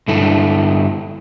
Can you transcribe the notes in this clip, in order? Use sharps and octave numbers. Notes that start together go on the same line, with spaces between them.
G2 D3 E4 A4